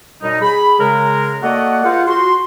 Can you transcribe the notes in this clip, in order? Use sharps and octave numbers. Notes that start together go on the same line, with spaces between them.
F#2 B2 G3 D#4
G#4 B5
C#3 G#3 A#4
A3 A#3 F#4 D5 D#5 F#5
A#3 F4 G#4 C5 F5 F#5
F#4 C6